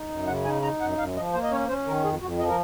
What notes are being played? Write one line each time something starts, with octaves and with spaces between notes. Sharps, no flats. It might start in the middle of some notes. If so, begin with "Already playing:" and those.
Already playing: D#4
F#2
C#3 F#5
D#4 G#5
D#4 A#5
F#2 F#5
F#2 F5
F3 D#5
A#3 C5
D#5
C#4 C#5
C#4 C5
D#3 A#4
F2 G#4
F2 F#4
F3 D#5
A#4